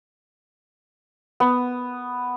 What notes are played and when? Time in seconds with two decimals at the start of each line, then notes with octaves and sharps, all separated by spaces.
1.40 B3